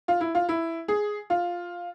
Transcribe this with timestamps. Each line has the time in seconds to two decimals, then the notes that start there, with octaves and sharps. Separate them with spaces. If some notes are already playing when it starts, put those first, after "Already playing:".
0.08 F4
0.21 E4
0.35 F4
0.49 E4
0.88 G#4
1.30 F4